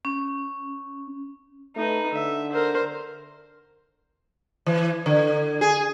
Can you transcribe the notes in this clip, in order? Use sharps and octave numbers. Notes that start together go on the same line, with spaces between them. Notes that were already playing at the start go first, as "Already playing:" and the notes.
C#4
A3 D#4 B4
D3 E5
A#4 C5
E3
D3
G#4